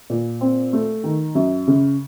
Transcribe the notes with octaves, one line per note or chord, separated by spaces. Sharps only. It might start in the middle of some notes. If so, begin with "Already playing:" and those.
A#2
C4
A3
D#3
F#2
C#3